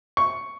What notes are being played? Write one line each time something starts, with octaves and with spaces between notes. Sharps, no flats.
C#6